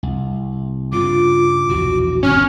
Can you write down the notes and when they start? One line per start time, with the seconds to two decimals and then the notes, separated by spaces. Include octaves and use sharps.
0.03 C2
0.92 G2 C#3 F4 D6
1.69 A#1 E2 B2 F#4
2.23 G1 F2 C4 C#4 F6